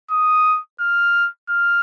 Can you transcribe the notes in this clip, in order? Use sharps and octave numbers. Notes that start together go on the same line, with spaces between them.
D#6
F6
F6